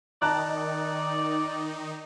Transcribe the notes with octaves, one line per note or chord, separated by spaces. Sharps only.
D#3 D#4 D5 A5 A#5 F#6